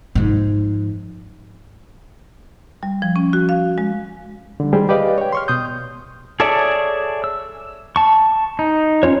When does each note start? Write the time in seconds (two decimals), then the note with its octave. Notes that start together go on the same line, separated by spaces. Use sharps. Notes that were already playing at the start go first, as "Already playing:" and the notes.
0.15 G#2 F3
2.83 G3
3.02 F3
3.16 C#4
3.33 F#4
3.49 F5
3.78 G#3
4.60 D3 G3
4.73 D#3 G3 G#3 G4 G#4 C5
4.89 G4 B4 D5 D#5 F5
5.18 C#5 G5
5.32 C6 C#6 F6
5.48 B2 C6 D#6 G6
6.40 G#4 A4 C#5 D5 E5
7.24 E6
7.96 A5 C#6
8.59 D#4
9.03 C#4 F4 C#5